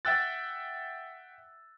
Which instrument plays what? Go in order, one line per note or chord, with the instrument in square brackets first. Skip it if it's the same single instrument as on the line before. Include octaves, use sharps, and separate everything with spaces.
[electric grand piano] E5 F#5 G5 E6 F#6 A6